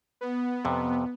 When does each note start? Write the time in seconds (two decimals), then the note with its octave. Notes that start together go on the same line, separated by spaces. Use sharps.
0.21 B3
0.65 F2 C3